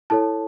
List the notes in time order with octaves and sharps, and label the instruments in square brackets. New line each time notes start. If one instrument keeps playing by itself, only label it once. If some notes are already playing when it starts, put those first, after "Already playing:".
[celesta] E4 A4 C#5 A5